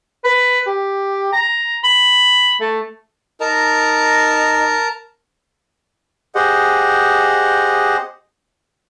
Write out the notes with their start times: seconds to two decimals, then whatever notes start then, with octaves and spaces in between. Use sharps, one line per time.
0.24 B4
0.67 G4
1.33 A#5
1.84 B5
2.60 A3
3.40 D#4 A#4 A5 A#5
6.35 G4 G#4 C5 D#5 F#5